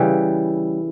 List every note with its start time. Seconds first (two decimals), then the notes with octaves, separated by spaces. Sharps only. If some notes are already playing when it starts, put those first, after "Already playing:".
Already playing: C#3 E3 G3